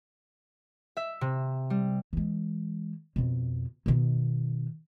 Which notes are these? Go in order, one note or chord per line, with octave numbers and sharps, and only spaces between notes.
E5
C3
G3
E3 G#3
F2 B2
B2 D#3